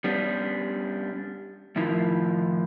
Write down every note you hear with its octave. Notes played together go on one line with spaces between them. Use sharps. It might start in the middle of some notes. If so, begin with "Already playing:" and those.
G3 B3 C#4 D4
A2 D#3 F3 E4